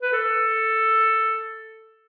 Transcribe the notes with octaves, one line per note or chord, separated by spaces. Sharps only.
B4
A4